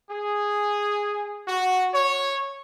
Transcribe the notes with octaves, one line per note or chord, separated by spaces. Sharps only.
G#4
F#4
C#5